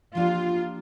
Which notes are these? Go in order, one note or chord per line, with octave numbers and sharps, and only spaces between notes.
F3 A#3 D4 F4 G4 A#4